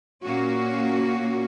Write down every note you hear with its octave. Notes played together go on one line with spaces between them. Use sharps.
A#2 A#3 C#4 F#4